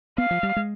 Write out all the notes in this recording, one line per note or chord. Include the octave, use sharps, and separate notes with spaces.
B3 F5
F3
G3
G#3